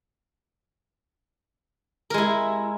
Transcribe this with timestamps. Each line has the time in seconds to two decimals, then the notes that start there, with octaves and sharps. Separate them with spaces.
2.10 A#4
2.14 G#3
2.18 E4